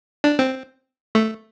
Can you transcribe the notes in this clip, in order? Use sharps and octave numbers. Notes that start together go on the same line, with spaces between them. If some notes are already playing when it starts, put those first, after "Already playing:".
D4
C4
A3